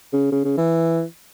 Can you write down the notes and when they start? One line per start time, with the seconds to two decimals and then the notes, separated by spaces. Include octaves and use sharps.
0.13 C#3
0.32 C#3
0.45 C#3
0.57 E3